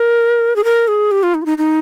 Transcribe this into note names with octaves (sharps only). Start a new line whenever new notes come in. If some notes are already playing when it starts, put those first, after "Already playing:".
Already playing: A#4
G#4
A#4
G#4
G4
F4
D#4
F4
D#4
D#4